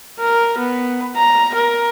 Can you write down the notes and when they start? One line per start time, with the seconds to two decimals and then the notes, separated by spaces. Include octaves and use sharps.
0.20 A#4
0.58 B3
1.16 A#5
1.54 A#4